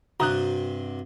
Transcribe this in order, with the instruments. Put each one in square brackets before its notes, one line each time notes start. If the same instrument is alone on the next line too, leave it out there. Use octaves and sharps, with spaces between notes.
[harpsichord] G2 C3 [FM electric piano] F#4 [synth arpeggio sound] A#5 D#6 F#6